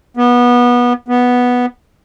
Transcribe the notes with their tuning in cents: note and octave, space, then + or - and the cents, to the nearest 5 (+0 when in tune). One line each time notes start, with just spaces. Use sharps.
B3 -20
B3 -5